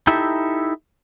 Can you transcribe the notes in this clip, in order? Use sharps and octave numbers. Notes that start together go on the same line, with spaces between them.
D#4 E4 G4 A4 E5